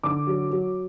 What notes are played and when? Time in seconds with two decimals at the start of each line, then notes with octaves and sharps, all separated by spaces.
0.03 D3 D6
0.27 F#3
0.51 F#3